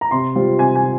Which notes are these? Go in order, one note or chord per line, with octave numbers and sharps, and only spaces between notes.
A#5
C3 C6
G3 C4 F4
C3 G#5
G#5
F4